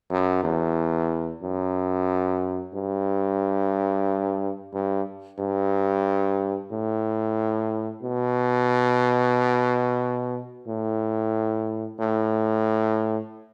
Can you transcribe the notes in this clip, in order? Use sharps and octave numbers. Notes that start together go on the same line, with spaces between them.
F#2
E2
F#2
G2
G2
G2
A2
B2
A2
A2